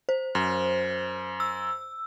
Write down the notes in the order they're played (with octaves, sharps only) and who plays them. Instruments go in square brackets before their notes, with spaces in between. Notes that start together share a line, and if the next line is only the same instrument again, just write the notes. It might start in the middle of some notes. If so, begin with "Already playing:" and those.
[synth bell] C5
[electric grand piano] F#2
[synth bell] E6